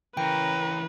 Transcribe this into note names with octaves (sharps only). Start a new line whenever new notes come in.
C#3 E3 A#4 B4 C#5 G5 A#5